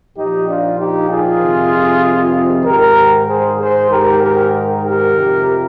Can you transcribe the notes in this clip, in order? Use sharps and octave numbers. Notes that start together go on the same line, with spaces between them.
A#2 F3 D#4 G4
D4 F4
D#4 G4
F4 G#4
F2 C3 D#3
G#2 D#3 G4 A#4
G#4 C5
G#4 C5
G#2 D#3 G4 A#4
G4 A#4
G4 A#4
F2 C3 F3